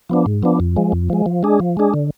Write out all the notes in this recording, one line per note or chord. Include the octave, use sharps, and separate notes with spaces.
F3 B3 D4
G#2
F3 B3 D4
F2
F3 G#3
F2
F3 G#3
F3
G#3 D4 G#4
F3
G#3 D4 G#4
D3